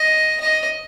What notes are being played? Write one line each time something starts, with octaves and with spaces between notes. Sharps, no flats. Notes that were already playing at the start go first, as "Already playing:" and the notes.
Already playing: D#5
D#5